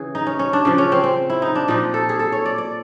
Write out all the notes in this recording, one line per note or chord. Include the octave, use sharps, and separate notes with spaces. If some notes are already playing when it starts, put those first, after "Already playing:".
Already playing: C#3 E3 G#4
D#4
C#4
C#4
D4
C#3 F3
C#4
C4
C4
E4
D#4
D4
A#2 F3 D#4
A4
G#4
A4
C#5
D5
D5